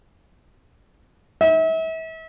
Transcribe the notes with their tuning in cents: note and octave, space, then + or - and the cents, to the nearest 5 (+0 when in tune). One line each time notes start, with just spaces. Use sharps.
E5 -35